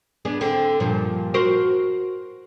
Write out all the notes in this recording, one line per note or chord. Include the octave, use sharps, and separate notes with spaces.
B3 D4 G#4
D3 C4
G2 A#2 F3
F#4 A#4 C5